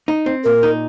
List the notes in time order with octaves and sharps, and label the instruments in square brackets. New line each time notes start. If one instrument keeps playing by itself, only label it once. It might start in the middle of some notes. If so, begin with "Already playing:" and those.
[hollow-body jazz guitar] D#4
C4
[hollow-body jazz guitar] A#2 [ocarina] A#4
[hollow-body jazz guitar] D#4